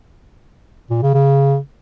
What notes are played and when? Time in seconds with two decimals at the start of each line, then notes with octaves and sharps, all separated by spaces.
0.90 A#2
1.02 C#3
1.14 C#3